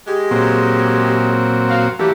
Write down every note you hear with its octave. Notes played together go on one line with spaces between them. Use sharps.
G#3 G4
A#2 F#3 C4
F#4 F5
E3 F#3 A3 A#3 E4 G4